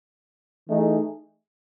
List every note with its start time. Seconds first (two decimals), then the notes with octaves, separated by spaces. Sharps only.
0.69 E3 A3 D#4 G#4